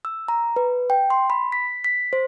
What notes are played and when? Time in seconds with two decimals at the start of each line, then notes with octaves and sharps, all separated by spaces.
0.05 E6
0.28 A#5
0.56 B4
0.90 G5
1.10 C6
1.30 B5
1.52 B6
1.84 B6
2.13 C5